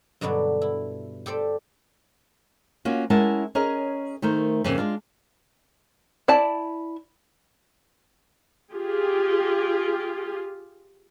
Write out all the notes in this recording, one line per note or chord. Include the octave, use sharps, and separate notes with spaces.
G2 B2 D3 F#3 D4
E4
G4 A4 C5 D5
A#3 C#4 F4 F#4
G#3 C#4 E4 A#4 F#5 A5
C#4 G#4 A#4 C#5 D#5
D#3 A3 A#4 C5
F2 A#2 C#3
G#3 D4 F4
E4 D5 A5
F4 G4 G#4